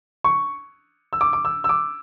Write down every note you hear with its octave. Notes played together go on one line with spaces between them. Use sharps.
C#6
E6
D6
D6
E6
E6
D6